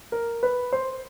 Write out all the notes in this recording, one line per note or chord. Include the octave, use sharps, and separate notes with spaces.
A#4
B4
C5